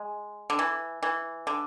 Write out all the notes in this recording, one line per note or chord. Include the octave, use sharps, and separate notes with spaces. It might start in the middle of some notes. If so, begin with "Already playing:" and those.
Already playing: G#3
D3
E3
E3
D3